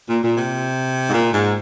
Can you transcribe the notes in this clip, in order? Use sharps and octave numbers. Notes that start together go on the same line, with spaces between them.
A#2
A#2
C3
G#2
A#2
G#2